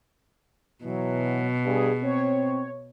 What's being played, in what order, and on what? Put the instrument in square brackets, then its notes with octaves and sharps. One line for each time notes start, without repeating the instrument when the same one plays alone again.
[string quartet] B2 [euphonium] E3 [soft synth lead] F#3
[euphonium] G2 [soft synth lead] G#4
[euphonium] C4 [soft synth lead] C#5